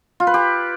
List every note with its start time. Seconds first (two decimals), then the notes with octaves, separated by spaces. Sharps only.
0.20 F4
0.27 B4
0.34 G4